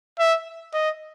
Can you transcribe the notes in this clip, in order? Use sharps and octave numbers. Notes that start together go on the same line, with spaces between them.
E5
D#5